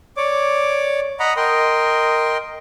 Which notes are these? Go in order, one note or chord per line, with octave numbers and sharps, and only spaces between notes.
C#5 D5 D6
D#5 F#5 A#5 B5
A#4 D#5 G5 C6